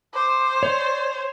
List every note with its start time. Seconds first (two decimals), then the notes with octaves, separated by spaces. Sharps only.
0.14 C5 D6
0.63 C#5 D5